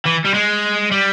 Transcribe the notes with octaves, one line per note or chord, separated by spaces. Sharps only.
E3
G3
G#3
G3